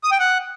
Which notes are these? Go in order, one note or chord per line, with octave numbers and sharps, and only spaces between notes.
D#6
G5
F#5